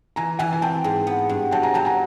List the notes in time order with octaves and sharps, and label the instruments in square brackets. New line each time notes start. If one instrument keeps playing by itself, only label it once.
[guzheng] E3 [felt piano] G#5 A#5
[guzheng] E3 [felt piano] F#5 G#5
[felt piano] G#5
[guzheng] C4 [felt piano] G5 A5
[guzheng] G#2
B3
G2
[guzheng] F#3 [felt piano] G5 A5
[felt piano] G#5 A#5
[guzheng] F#3 [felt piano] G5 A5
[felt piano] G#5 A#5